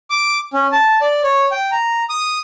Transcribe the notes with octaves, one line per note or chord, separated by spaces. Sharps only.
D6
C#4
A5
D5
C#5
G5
A#5
D#6